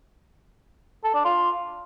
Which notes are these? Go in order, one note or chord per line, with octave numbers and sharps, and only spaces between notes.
A4
D4
F4